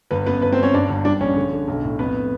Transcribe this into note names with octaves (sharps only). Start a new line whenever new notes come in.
G1 B3 B4
F#2 B3 B4
G1 B3 B4
C4 C5
G3 C#4 C#5
G2 D4 D5
G1
G3 D4 D5
A#1 C#4 C#5
D3
D3
B1
A2
F2 B3 B4